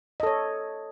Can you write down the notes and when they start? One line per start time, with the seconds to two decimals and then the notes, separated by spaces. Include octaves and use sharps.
0.20 D#5
0.23 A4
0.27 C#5